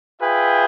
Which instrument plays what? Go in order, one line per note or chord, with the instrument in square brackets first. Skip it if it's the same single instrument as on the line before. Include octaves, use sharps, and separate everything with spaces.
[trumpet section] F4 G#4 B4 E5 G5